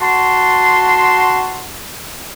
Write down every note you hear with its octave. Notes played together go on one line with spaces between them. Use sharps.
F#4 A5 C6